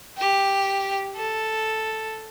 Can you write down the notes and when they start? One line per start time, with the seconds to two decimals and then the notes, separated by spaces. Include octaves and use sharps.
0.17 G4
1.16 A4